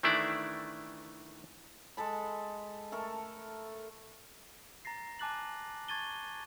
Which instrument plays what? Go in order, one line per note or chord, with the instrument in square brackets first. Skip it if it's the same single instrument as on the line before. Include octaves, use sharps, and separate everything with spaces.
[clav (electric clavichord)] D#3 E3 A3 D4 E4 D5
[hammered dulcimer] G#3 A4 A5 B5
A3 A4 A#4
[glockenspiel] A#5 A6 A#6 C7
G#5 A5 D6 F#6 A6 F#7
A5 C#6 G#6 A6 D#7 G7